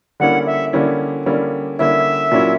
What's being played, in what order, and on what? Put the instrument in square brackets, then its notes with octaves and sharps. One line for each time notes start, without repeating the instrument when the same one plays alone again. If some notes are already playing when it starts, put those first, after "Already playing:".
[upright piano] D3 G3 A#3 C#4 E4 [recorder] F#5
[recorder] E5
[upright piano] D3 G3 A#3 C#4 E4
D3 G3 A#3 C#4 E4
[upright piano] D3 G3 A#3 C#4 E4 [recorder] E5
[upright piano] A#2 F#3 C#4 E4